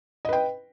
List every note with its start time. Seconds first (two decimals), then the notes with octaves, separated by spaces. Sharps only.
0.25 D#5
0.29 B4
0.33 G5